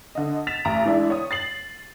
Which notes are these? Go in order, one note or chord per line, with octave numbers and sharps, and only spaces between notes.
D3 D#5
A6 B6 E7 F7
A1 A#5
E3 G#3 D4 E4
C#5 D#6
A6 C7 F#7